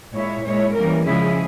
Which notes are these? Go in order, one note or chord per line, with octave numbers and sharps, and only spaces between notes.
A#2 G#3 E4 C#5
A#2 G#3 E4 C#5
E3 G3 A#3 C#4 A#4
C#3 F3 G#3 C#4 E4 G#4